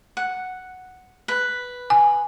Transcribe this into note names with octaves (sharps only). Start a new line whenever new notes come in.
F#5
B4
G#5